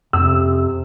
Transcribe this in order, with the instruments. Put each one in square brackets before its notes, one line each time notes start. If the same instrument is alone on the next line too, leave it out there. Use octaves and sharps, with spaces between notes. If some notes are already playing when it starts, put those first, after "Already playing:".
[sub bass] F2 [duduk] C3 [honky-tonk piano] E6